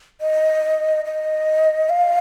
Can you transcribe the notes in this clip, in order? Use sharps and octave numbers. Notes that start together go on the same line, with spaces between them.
D#5
D#5
F5